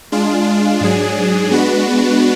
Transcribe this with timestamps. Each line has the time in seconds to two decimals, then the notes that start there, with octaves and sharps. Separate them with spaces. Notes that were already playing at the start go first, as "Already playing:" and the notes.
0.12 G#3 D4 F4
0.81 G#2 F#3 D4 G#4
1.50 G#3 B3 D4 F#4 B4